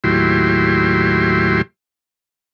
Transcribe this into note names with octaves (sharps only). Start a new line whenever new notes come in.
D#2 A2 F#3 E4 G4 C6